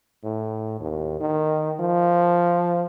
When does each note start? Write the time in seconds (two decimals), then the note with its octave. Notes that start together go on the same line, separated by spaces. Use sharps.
0.24 A2
0.81 D#2
1.20 D#3
1.80 F3